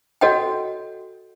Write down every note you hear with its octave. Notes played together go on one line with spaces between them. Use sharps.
F#4 A4 C#5 D#5 F#5 G5